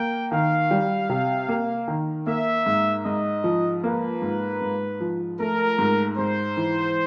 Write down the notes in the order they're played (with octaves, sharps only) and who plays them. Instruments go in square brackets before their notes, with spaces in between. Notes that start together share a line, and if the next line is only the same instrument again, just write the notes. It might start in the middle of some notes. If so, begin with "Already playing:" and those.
Already playing: [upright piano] A#3 [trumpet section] G5
[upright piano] D#3 [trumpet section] F5
[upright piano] G3
C3
A#3
D#3
[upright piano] A#3 [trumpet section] E5
[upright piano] G#2
[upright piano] G#2 [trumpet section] D#5
[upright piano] F3
[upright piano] A#3 [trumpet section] B4
[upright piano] G#2
G#2
F3
[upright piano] A3 [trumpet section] A#4
[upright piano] G#2
[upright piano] G#2 [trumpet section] C5
[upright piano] E3